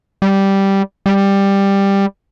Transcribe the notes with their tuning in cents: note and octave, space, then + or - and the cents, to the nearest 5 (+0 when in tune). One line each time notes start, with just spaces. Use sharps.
G3 -5
G3 +10